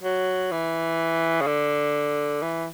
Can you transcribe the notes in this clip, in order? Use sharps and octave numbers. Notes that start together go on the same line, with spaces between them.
F#3
E3
C#3
D3
E3